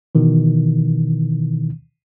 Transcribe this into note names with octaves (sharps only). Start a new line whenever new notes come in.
B2 D#3 E3